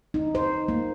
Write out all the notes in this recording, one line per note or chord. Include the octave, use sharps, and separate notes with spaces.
D#4
C5
A#3